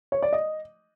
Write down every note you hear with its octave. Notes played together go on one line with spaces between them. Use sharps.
C#5
D5
D#5